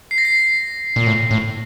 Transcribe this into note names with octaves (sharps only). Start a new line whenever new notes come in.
C7
A#6
C7
A#2
A2
A2